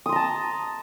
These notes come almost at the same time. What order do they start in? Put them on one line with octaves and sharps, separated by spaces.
D#6 C6 A#5 A5